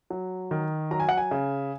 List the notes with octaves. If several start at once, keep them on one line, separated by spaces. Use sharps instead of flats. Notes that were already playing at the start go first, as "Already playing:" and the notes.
F#3
D#3
F#3 A#5
G#5
F#5
G#5
C#3